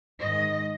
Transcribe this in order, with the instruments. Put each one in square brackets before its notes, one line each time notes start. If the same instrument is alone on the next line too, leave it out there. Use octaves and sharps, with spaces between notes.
[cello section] G#2 D#3 D#5